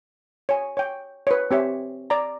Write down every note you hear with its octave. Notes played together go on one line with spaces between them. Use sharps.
C#5 G#5
C#5 G5
B4 C#5
C4 G4 C#5 E5
D5 A#5